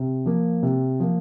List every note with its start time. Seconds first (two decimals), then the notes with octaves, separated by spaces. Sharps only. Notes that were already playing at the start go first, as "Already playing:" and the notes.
Already playing: C3
0.26 F3 A#3
0.63 C3
1.00 F3 A#3